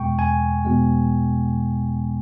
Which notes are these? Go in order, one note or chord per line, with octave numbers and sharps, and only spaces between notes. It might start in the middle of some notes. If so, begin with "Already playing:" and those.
Already playing: E2 B2 G#3 G5 C#6
E2 G#5
B2 G#3